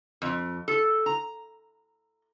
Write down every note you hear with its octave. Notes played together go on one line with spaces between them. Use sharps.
F2
A4
A#5